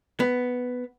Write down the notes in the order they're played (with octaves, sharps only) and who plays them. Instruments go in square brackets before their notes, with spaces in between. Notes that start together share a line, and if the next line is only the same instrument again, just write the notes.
[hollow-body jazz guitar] B3